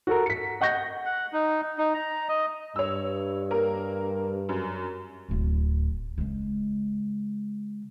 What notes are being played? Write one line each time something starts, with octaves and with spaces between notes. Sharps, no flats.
F#4 A4 A#4
B6 C#7
D#5 F#5 C#6 G6 A#6
F#5
D#4
D#4
A#5
D#5
G2 C#5 E6
A#3 A#4
F#2
D1 A2
C#3 G#3